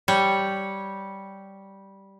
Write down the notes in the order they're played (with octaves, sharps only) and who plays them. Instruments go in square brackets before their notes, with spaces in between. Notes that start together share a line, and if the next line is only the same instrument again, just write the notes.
[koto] G3 C#5